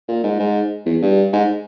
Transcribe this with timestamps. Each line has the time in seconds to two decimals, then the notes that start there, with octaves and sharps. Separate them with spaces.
0.08 A#2
0.24 G#2
0.39 G#2
0.86 E2
1.01 G2
1.32 G#2